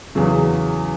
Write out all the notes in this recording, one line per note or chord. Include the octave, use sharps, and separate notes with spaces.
E2 C#3 F#3